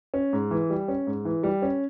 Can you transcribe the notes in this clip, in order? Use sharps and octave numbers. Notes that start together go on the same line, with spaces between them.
C#4
G#2
E3
G3
C#4
G#2
E3
G3
C#4